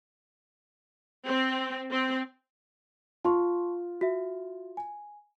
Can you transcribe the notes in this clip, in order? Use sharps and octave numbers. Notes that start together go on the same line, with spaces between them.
C4
C4
F4 A5 C6 C#6
F#4 E5
G#5